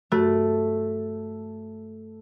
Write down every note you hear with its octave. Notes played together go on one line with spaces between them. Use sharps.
G2 A3 F#4